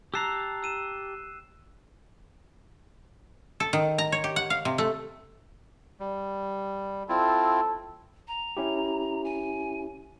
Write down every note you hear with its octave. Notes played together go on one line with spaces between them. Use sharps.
G4 A5 A#5 E6 F#6 C7
E6 D#7 E7
A4
D#3
A#5
C#5
G4
F#5
F5
C3
A3
G3
C4 E4 F4 A4
A#5
C#4 E4 G4
G#5